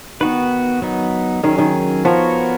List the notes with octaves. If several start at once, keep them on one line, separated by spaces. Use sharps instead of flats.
D#3 B3 F#4 B4
F#3 B3 D#4
D#3 F#3 C#4 G#4
D#3
F3 B3 F#4 A#4 C#5